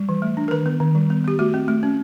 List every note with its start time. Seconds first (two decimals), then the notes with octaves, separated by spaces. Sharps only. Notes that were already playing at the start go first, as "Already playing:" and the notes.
Already playing: G3
0.09 E3
0.22 A3
0.37 D4
0.48 A#4
0.51 D#3 B4
0.66 B3
0.80 D#3
0.95 G3
1.10 B3
1.24 B3 G4
1.39 A3 F#4
1.54 C4
1.68 A3
1.83 C#4